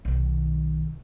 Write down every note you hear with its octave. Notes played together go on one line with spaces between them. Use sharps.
B1 D#3